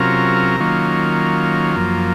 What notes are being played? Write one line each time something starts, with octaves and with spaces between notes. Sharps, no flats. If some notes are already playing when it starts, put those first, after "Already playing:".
Already playing: C3 F#3 C#4 F4 A#4
D#3 F#3 A#3 C#4 F4
F#2 F3 A#3